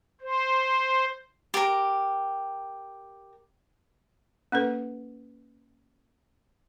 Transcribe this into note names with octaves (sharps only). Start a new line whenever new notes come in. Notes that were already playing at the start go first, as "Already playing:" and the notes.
C5
G4 A#4
A#3 C#4 A4 B4